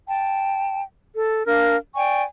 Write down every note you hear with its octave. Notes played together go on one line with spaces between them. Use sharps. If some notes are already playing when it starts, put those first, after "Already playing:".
G5 A5
A4
D4 A#4 F5
D5 G5 G#5 C#6